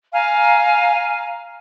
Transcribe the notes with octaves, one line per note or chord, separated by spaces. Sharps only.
F5 G#5 A#5 F6